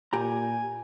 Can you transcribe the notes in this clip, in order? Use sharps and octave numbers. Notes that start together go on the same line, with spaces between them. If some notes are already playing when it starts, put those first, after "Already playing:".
A#2 G4 G#5 A#5